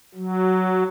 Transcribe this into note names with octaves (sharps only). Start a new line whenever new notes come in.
F#3